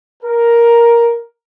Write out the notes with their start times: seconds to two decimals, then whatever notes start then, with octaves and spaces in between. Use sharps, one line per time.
0.23 A#4